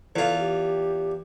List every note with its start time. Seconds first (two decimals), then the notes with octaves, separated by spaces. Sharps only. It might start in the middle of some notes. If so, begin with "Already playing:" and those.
0.16 E2 F4 A4
0.39 G4